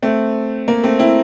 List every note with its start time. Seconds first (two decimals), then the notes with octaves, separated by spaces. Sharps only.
0.02 A3 C4
0.68 A#3
0.84 A3 C4
0.99 C4 E4